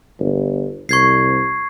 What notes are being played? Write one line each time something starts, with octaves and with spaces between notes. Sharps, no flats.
G1
C2 C#6 G#6 C7